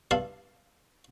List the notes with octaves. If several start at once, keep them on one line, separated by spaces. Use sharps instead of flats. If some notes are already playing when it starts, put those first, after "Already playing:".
G2 E4 F5 A5 C6